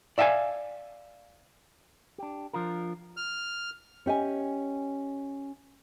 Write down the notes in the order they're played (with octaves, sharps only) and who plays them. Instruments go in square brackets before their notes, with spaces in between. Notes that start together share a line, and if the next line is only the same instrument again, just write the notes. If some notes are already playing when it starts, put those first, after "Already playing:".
[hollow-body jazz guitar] D5 E5 F5 G5 G#5
[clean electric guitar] D4 G4
F3 D4 F4 A#4
[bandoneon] F6
[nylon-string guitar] C#4 G4 D#5 G#5